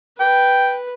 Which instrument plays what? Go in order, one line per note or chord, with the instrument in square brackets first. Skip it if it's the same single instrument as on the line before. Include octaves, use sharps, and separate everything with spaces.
[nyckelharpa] B4 [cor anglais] G5